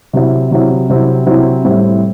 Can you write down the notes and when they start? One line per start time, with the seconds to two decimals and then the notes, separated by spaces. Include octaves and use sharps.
0.13 C3 F#3 C4 E4
0.51 C3 F#3 C4 E4
0.90 C3 F#3 C4 E4
1.27 C3 F#3 C4 E4
1.64 A2 G3 C4 E4